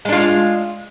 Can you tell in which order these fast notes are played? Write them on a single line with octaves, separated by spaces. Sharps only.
G#3 D4 F4